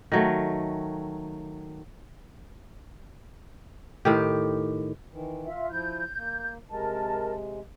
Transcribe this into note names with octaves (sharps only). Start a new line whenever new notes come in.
D#3 F#3 A3
A2 D#3 G4
D#3 E3
F4 E5
F3 E4 G6
A#3
C3 G#3 A#4 A5